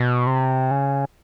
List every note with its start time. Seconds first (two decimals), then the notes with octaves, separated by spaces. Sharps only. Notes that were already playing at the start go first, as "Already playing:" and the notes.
Already playing: B2
0.26 C3
0.71 C#3